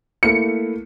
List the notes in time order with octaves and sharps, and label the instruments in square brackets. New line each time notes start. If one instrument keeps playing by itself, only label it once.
[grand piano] A3 A#3 E4 [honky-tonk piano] C#7